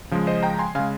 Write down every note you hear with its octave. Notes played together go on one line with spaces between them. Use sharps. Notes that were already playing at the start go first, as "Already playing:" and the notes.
C#3 F3 G#3
C5 D#5
G5 A#5
G#5 C6
C#3 G#3 F5 G#5